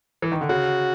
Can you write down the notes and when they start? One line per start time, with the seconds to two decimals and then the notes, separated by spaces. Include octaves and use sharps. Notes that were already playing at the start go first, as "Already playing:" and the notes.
0.22 E3
0.32 D#3
0.41 D3
0.49 C#3 F#4